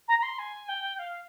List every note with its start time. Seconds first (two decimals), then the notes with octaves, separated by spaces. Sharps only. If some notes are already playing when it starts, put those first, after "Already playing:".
0.08 A#5
0.18 A#5
0.23 C6
0.39 G#5
0.69 G5
0.99 F5